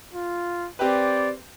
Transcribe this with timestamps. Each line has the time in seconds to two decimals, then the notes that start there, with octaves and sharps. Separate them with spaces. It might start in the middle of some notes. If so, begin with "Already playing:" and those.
0.14 F4
0.79 C4 G4 B4 D5